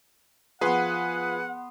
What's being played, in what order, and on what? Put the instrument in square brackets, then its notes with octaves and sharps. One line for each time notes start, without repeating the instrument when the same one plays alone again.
[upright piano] F3 [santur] B3 C6 [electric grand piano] G#4 B4 [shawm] F#5